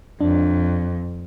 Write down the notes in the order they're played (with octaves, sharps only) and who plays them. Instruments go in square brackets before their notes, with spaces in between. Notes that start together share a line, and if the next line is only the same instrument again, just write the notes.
[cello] F2 [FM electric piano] D4